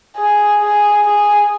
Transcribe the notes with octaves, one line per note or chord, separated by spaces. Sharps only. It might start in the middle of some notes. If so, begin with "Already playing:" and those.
G#4
G#4
G#4